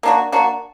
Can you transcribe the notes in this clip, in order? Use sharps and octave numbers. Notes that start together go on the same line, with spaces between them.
A#3 D4 F#4
A#3 D4 F#4